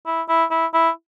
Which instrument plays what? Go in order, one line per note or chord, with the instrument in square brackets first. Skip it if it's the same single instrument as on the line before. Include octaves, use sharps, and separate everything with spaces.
[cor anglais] E4
E4
E4
E4